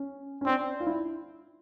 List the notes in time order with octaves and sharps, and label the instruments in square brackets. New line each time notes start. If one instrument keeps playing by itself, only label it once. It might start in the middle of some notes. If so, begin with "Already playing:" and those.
Already playing: [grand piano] C#4
C#4
[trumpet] C4 [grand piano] D4
[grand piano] F4
E4